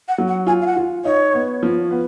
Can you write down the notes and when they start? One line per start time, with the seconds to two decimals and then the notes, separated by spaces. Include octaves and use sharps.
0.08 F#5
0.18 F#3
0.28 F#5
0.46 F4 G#5
0.61 F5
0.66 F#5
0.76 F4
1.05 D#4 C#5
1.34 B3
1.63 F3
1.91 B3